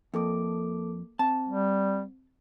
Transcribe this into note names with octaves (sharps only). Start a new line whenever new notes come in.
F2 A#3 A4 D6
C4 A5
G3